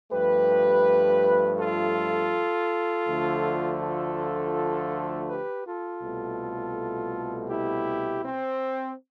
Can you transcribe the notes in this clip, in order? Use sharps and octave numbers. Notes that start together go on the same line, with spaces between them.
G2 F3 A3 G4 B4
F4 A4
D2 D3 F3 A3
F4 A4
G4 B4
F4 A4
C2 B2 A3
E4 G4
C4